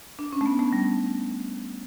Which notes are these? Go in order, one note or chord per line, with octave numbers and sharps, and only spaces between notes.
D4
C#4
A3
B3
A3
G3